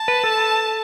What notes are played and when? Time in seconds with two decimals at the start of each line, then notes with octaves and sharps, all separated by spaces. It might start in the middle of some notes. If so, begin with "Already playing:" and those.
Already playing: A5
0.08 B4
0.24 A4